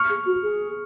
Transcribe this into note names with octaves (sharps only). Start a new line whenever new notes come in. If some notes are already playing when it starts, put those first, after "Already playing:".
Already playing: C#6 F6
G#4
F#4
G#4